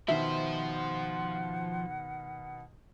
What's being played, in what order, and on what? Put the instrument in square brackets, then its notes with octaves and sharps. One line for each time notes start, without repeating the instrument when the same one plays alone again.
[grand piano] B2 D#3 [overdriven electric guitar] F3 C5 [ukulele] E5 [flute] F#5